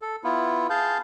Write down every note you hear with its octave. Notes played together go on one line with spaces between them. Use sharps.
A4
B3 E4 F4
G#4 F5 A5 G6